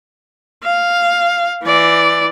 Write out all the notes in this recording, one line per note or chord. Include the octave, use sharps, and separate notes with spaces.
F5
E3 D5